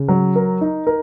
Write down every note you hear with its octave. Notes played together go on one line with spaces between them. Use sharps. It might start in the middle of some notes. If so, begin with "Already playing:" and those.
Already playing: C#3
F#3
A#4
D#4
A#4